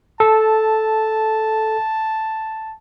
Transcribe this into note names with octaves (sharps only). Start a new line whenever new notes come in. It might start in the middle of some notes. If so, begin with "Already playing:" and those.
A4 A5